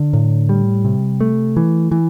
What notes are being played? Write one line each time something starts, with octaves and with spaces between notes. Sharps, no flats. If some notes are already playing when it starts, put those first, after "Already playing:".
Already playing: D3
A2
G3
C3
A3
E3
E3